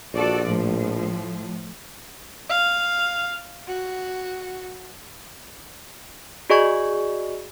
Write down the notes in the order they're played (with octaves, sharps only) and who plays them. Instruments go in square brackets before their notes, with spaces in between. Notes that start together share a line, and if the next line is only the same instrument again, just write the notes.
[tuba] A#1 [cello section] F#4 A4 D5
[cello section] A2 F3
[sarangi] F5
F#4
[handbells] F#4 G#4 D5 D#5 G#5 C#6